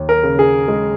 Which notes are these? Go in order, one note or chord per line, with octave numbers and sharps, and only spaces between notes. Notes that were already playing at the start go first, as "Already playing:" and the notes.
Already playing: D#2
A#4
C#3
G#4
G#3